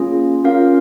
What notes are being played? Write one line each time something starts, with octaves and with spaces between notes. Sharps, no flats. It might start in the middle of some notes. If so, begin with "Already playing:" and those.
Already playing: A#3 C#4 F4 G#4
C#4 F4 A#4 F5